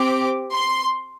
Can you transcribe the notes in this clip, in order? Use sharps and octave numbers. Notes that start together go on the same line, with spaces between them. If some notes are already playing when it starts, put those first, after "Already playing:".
Already playing: C4 G4 D6
C6